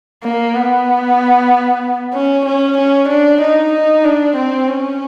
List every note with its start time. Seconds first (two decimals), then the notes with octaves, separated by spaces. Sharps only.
0.23 A#3
0.55 B3
2.13 C#4
2.46 C#4
2.78 C#4
3.09 D4
3.41 D#4
3.73 D#4
4.04 D4
4.37 C4
4.68 C#4